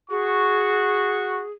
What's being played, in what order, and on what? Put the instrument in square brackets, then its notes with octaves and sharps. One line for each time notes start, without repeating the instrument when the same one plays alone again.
[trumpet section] F#4 C#6 [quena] G#4